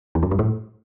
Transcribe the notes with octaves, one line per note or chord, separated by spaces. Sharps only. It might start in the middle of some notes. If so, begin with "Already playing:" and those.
E2
F#2
G2
A2